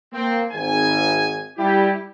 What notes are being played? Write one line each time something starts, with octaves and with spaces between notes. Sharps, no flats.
A#3 C4
G#1 G#5
G3 E4 G4